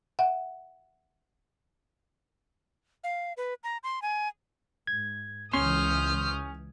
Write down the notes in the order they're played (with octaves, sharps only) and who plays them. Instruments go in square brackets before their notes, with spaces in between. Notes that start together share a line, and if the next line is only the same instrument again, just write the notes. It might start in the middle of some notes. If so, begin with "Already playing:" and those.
[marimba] E5 F#5
[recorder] F5
B4
A#5
C6
G#5
[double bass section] G#2 [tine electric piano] G#6
[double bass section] C#2 C#3 E3 [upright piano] C#4 [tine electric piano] C6 [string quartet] D#6 F6 G6